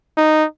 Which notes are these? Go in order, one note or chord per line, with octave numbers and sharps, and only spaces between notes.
D#4